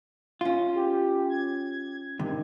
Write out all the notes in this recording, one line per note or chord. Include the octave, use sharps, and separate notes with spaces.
C#4 F4
G4
G#6
G2 C3 D#3